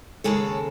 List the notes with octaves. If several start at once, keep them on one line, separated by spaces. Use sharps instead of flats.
D#2 C#3 G#3 A4 C#5